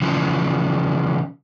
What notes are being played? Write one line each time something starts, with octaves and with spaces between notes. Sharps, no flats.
C#3 E3 F3